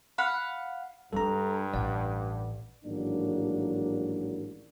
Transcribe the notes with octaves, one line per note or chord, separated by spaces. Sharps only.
F5 F#5 B5
G2 G3 D4 A4 A#5
A1 D5 F#5
A1 G#2 D#3 F#3 A#3 D4